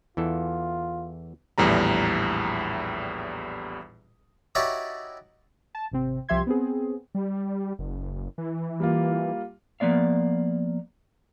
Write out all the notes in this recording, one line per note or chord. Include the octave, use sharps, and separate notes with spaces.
E2 E3 F4 A4
A#1 E2 A2 G3 A#5
D#4 E4 F#4 G4 C#5 D5
A5
G#1 C3 C4
C2 F3 G4 E5 C6 G#6
B3 C4 G#4
G3
F#1
E3
G3 A#3 F4
F3 A#3 B3 D5 F5